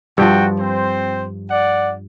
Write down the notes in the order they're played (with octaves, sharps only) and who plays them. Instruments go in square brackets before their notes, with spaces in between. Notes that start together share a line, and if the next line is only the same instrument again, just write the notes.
[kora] G2 F3 [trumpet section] F#4 G5
[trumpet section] C4 C5
D5 F#5